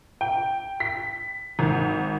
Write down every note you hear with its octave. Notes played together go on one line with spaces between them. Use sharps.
G5
B6
G#1